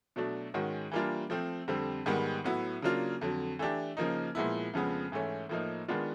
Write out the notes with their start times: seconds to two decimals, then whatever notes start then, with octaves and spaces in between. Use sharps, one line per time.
0.16 B2 F#3 A3 D4
0.54 G#2 D#3 G#3 C#4 F#4
0.92 E3 G3 A#3 D4 F4
1.30 F3 A3 C4
1.68 F2 D3 G3 C4
2.06 G#2 D#3 G3 B3
2.44 A2 F#3 B3 E4
2.82 C#3 F#3 A#3 D4 F4
3.21 F2 D3 F#3
3.59 E3 A3 D4 G4
3.97 C#3 F3 A#3 D#4
4.35 A#2 F3 G#3 B3 E4
4.74 F2 C#3 F3 G#3 B3
5.12 G#2 E3 A3 C#4
5.49 A2 F3 A#3 D#4
5.88 D#3 G#3 B3 D4 F4